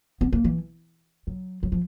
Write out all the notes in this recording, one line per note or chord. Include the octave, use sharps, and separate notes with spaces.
B3
A#3
E3
F#3
F#3
F3